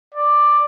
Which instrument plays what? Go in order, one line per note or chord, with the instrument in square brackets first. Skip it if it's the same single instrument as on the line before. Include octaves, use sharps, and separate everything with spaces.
[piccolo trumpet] D5